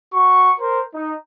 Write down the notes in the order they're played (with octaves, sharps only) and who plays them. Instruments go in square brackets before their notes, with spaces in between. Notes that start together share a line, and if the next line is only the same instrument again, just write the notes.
[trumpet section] F#4 C#6
A#4 C5
D#4